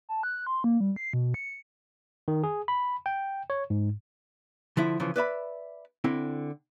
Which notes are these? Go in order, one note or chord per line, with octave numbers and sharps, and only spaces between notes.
A5
F#6
C6
A#3
G3
C7
B2
C#7
D#3
G#4
B5
G5
C#5
G#2
D3 F3 E4
C#3 E3 F3
B4 D5 E5 B5
D3 C4 E4